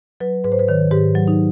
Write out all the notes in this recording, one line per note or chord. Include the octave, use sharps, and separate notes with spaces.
F#3 B4
G#2 B4
C5
B4
D#3 C#5
G#2 G4
F#3
D#4